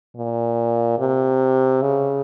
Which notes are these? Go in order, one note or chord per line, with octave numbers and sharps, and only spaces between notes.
A#2
C3
C#3